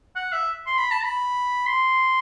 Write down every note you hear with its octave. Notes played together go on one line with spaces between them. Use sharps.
F#5
E5
C6
B5
A5
B5
C6